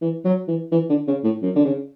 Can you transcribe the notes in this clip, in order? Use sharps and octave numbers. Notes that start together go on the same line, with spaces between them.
E3
F#3
E3
E3
D3
C#3
A2
F#2
D3
C#3